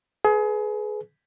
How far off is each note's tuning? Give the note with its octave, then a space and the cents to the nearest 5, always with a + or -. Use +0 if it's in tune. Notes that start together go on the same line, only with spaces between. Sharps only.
G#4 +30 B4 +0